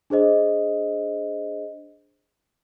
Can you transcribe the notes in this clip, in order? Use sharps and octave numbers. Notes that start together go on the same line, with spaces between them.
D4 G#4 C5 D#5